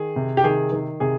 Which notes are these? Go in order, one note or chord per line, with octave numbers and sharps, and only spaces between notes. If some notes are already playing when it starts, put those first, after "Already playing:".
Already playing: D#3 G#4
C3
G4
D#3 G#4
D#3
C3 G#4